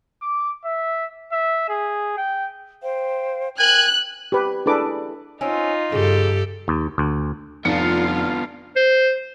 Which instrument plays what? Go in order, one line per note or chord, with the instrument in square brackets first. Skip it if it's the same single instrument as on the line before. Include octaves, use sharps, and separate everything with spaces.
[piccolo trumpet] D6
E5
E5
G#4
G5
[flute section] C5 F5 G5
[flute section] A#4 G5 G#6 [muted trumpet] G#5 [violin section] F#6
[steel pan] G4 B4
D4 E4 G#4 A4 B4 D6
[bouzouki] C4 C#4 [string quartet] D#4 F4
[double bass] G2 [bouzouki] C#3 [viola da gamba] G4 A4
[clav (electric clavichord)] D#2
D2
[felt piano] F1 C#7 [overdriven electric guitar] B3 D4 [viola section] F4 F5
[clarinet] C5